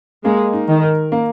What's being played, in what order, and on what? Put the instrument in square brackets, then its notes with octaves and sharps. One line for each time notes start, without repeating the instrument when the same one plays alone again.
[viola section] G#3 [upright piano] A#3
[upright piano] D#4
[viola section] D#3
[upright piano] A#4
A#3